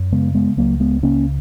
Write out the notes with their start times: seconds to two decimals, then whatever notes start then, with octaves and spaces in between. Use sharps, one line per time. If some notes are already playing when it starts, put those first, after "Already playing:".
Already playing: F#2
0.12 C#3 G#3 B3
0.35 G#3 B3
0.57 C#2 F#3 A#3
0.80 G#3 B3
1.03 C#3 A#3 C#4